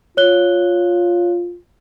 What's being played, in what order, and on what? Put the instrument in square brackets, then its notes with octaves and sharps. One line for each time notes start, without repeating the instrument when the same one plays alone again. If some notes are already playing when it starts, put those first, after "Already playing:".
[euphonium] F4 [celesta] C#5 F#6 G7